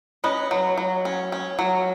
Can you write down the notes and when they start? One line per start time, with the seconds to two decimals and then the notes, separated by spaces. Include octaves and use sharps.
0.24 C#4 B4 D#5
0.51 F#3
0.78 F#3
1.05 C#4
1.32 C#4
1.59 F#3